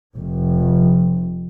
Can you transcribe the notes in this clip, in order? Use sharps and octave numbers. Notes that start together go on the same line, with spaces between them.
F1